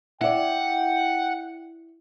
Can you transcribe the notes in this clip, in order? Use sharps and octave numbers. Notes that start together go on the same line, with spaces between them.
E4 D5 F#5 G5